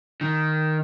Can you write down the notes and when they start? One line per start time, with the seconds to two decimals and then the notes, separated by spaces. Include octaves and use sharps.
0.21 D#3